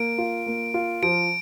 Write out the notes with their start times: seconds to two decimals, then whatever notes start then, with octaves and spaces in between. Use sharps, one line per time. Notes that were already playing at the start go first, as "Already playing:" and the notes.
Already playing: A#3 D7
0.18 F4
0.46 A#3
0.74 F4
1.03 F3 D7